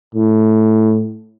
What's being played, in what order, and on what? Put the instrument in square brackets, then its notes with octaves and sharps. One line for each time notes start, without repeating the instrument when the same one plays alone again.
[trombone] A2